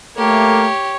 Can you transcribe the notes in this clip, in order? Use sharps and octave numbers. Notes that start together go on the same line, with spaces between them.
A3 A#3 G4 A4 C#5